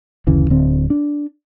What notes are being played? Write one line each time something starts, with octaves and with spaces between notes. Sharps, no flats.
F#1 D2 C#3 E3
D1 D3 C4
D4